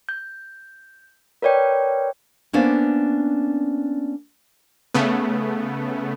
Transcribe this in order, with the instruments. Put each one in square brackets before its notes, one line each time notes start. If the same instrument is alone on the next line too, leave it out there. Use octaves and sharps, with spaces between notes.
[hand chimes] G6
A#4 B4 C#5 D5 G5
[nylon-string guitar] A#3 B3 C#4 D4 C5
[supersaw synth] C#3 A3 B3